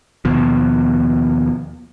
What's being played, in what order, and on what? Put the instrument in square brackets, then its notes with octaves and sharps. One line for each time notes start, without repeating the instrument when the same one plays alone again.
[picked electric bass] D#2 B2 F3